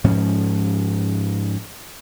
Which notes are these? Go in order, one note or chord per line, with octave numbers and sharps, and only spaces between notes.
G#2 F3 C#4